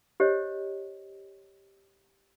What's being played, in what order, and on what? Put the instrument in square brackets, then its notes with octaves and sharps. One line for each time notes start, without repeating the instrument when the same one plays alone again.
[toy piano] G4 C5 C#5 D#5